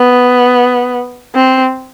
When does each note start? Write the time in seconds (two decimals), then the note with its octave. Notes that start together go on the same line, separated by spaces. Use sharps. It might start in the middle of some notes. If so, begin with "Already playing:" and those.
Already playing: B3
1.35 C4